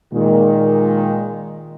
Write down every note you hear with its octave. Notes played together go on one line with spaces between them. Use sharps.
A#2 D#3 G#3